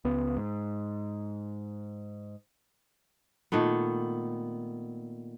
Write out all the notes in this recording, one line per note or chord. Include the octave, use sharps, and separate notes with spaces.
C#2 B3
G#2
A#2 D#3 A3 B3